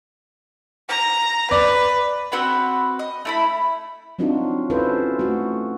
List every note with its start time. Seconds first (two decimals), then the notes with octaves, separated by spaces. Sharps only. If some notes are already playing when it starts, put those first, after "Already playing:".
0.89 A#5
1.51 B4 D5
2.32 C4 F#4 B4 B5
2.99 D#5
3.25 A3 E4 B5
4.19 F#3 C4 D4 D#4 F4 F#4
4.70 C#4 E4 F4 A4 B4 C5
5.19 A3 F#4